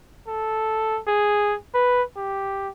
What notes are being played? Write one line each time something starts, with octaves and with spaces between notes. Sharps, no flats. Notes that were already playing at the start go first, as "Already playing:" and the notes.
A4
G#4
B4
G4